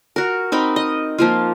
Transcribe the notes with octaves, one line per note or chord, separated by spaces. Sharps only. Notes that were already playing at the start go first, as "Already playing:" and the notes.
F#4 A#4
C4 D#4 A#4 B5
D#5
F3 A#3 F4